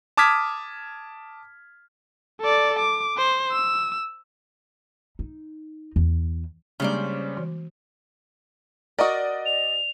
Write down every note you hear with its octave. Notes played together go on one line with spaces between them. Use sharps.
A5 D6 D#6 F6 G#6 B6
A4 D5
D6
C5
E6
D#4
E2
C#3 G3 G#3 A#3 C#4 D4 C5 D5
E3 F#4
F#4 A#4 D5 D#5 D#6
F7